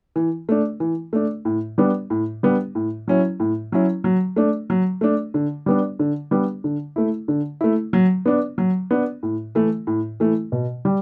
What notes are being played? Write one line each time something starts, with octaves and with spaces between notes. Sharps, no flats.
E3
A3 D4
E3
A3 D4
A2
G3 B3 D4
A2
G3 B3 D4
A2
F#3 C#4 E4
A2
F#3 C#4 E4
F#3
A3 D4
F#3
A3 D4
D3
G3 B3 D4
D3
G3 B3 D4
D3
A3 E4
D3
A3 E4
F#3
B3 D4
F#3
B3 D4
A2
E3 A3 E4
A2
E3 A3 E4
B2
G3